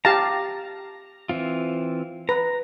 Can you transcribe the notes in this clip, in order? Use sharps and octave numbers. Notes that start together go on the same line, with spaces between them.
G4 F5 A5 A#5
E3 C4 F4
B4 A#5